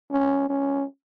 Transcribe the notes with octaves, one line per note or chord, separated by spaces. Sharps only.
C#4
C#4